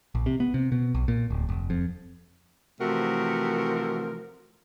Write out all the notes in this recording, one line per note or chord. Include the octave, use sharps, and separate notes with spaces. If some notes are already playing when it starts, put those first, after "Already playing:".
A#1
C3
B3
C3
B2
B1
A#2
D1
F1
F2
C3 E3 F3 A3 F#4 A#4